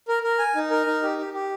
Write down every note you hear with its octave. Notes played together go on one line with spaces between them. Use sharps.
A#4
A#4
G#5
D#4
A#4
D#4
G4
G4
G4